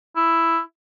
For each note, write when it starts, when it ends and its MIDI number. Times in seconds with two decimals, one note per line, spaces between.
0.16 0.60 64